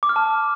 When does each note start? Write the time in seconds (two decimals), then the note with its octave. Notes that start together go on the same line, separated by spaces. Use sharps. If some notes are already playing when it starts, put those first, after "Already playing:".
0.03 D6
0.09 F6
0.16 A5